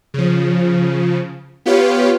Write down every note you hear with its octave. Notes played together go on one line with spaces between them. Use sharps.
C#3 F3
B3 F4 G4 B4 C#5 F5